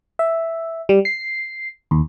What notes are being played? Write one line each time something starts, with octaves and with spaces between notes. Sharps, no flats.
E5
G3
C7
D#2